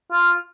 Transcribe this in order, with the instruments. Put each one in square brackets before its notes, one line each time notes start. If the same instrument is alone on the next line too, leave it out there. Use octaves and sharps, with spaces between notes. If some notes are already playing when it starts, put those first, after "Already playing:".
[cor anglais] F4